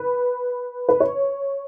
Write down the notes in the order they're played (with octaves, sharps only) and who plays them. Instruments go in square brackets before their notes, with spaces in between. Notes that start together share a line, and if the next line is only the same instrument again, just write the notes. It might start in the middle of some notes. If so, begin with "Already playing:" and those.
Already playing: [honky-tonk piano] B4
B4
C#5